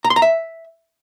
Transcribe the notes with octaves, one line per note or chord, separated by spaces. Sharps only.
A#5
C6
A#5
E5